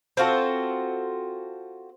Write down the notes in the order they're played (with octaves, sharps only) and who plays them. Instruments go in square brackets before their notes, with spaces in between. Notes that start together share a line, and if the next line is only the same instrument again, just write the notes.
[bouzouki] C4 F4 F#4 A4